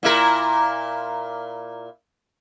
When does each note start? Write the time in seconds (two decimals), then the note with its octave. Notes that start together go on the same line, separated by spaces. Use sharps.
0.03 A#2 E4 A#4